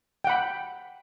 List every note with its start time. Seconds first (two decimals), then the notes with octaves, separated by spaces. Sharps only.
0.24 G5
0.27 F#5
0.30 B5